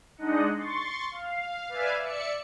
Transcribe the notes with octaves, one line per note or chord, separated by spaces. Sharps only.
G#3 D4 D#4 D#5 F#5
C6 C#6 A6
F5
B4 D5 E5 F5 G#5
D5 E5 C#7